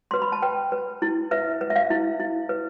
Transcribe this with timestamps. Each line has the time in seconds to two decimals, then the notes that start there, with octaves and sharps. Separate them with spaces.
0.11 B4 C6
0.22 B5
0.32 A5
0.42 B4 G5
0.72 B4
1.02 E4
1.31 B4 E5
1.61 B4
1.70 E5
1.76 F5
1.90 E4
2.20 E4
2.49 B4